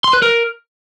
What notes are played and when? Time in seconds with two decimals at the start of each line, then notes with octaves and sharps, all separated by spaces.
0.04 C6
0.13 B4
0.22 A#4